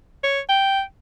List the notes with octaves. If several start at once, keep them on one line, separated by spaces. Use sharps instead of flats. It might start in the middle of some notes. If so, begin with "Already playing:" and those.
C#5
G5